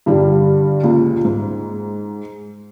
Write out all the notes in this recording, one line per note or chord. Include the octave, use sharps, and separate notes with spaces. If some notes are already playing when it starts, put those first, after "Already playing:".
G2 D3 G3
C#2 A#2
G#2